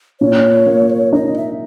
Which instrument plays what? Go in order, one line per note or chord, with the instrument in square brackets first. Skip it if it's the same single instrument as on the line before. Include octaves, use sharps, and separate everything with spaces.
[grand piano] A#2 [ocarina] C#5
[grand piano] A#3
[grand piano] D#4 [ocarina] D#5
[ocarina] E5